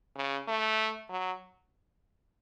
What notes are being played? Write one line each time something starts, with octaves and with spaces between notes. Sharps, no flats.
C#3
A3
F#3